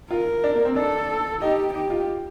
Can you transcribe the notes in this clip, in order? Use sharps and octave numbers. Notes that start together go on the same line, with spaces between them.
F4 A#4
D4
A#3
C4
D4 A4
D#4 G4
D#4 G4
F4